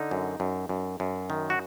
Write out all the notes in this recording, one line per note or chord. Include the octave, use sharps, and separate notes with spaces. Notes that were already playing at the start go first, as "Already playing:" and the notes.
Already playing: D3 D#4
F#2
F#2
F#2
F#2
D#3
F#4